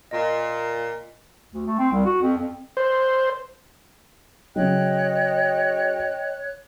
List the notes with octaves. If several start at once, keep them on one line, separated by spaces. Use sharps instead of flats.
A#2 D#5
D2
A3
C4
C2
F#4
F2
F2
C5
C#3 F#3 C#5 D#5 G5 F#6